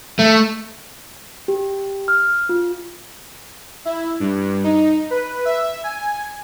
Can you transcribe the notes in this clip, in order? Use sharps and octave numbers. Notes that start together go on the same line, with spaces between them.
A3
G4
F6
F4
E4
G2
D#4
B4
E5
G#5